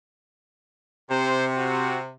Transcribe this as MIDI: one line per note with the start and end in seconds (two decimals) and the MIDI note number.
1.10 2.11 48
1.10 1.46 72
1.57 1.98 66